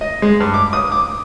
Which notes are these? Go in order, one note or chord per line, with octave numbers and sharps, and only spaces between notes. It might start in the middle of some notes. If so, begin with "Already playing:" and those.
D#5
G#3
G2
D6
D#6
D6